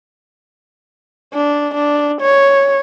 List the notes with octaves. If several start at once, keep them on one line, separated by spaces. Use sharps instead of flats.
D4
D4
C#5